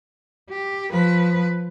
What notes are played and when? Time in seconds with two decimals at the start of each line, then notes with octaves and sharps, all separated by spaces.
0.50 G4
0.90 F3 B4